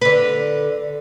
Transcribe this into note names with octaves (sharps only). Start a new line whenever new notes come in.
D3 B4